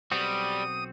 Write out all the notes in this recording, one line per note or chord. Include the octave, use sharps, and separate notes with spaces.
B1 G3 C4 F#4 D#6